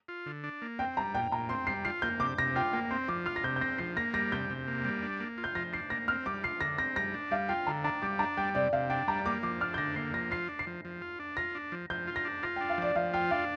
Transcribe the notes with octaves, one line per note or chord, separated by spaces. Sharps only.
F4
D3
D4
A#3
C4 G5
G3 A#5
A#2 G5
A#2 A#5
C4 C6
G3 C7
F4 C7
A#3 G6
C3 D6
C3 A#6
F4 G5
A#3 G5
C4 C6
F3 D6
F4 F6
A#6
C3 G6
G6
C4 A#6
F3 C7
A#3 A#6
G3 A#6
C3 G6
C3
A#3
G3
D4
A#3
F4
G6
F3 A#6
D4 C7
A#3 A#6
C4 F6
G3 D6
F4 C7
D3 A#6
C4 A#6
G3 A#6
D4
G3 F5
F4 G5
D3 A#5
D4 A#5
G3 D6
D4 A#5
G3 G5
C3 D5
C3 F5
D4 G5
G3 A#5
A#3 D6
F3 D6
D4 F6
G6
D3 A#6
A#3 C7
F3 A#6
F4 C7
D4
C7
F3
F3
F4
D4
F4 A#6
D4
F3
F3 G6
F4
A#6
D4
F4 A#6
G5
D4
F5
F3 D5
F3 F5
F4 G5
D4 F5